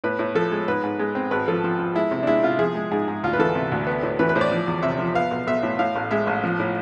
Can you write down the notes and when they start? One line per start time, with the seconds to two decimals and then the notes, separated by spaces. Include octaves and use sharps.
0.04 A2 B4
0.19 A2
0.35 F3 A4
0.52 G#3
0.68 G#2 B4
0.83 G#2
0.99 G#3
1.15 C4
1.31 G#1 B4
1.48 F3 A4
1.64 F3
1.79 F3
1.95 G#3 E4
2.11 C3
2.23 D4
2.27 G#3 E4
2.43 C3 F4
2.59 F3 G#4
2.75 G#3
2.91 G#2 G#4
3.08 G#2
3.23 D2 F4
3.33 B4
3.39 E3 A4
3.55 C3
3.71 D2
3.87 B3
4.03 A2
4.19 E3 B4
4.29 B4
4.35 A2 C5
4.41 D5
4.51 F3
4.68 E2
4.83 C3 E5
4.99 F3
5.14 B3 F5
5.31 B1
5.47 B1 E5
5.63 A2
5.79 A2 F5
5.96 A1
6.11 G#3 E5
6.27 A1
6.44 F3
6.59 A2